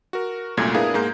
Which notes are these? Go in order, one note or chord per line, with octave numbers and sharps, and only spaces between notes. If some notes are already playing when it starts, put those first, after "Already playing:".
F#4 A#4
C2 F#2 A#2 A3 A#4 G#6
B3 D4 E4 G#4 A#4 F5
G#2 G#3 A#3 A#5 G6